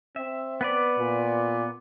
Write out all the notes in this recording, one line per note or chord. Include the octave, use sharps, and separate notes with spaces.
C4 E5
B3 B4 D5
A#2